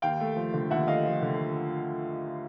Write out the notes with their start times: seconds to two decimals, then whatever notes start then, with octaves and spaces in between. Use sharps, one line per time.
0.02 D#2 F5 G5
0.20 A3
0.36 F3
0.54 D3
0.71 D#2 E5 F#5
0.88 A3 D#5 F5
1.05 F3
1.22 D3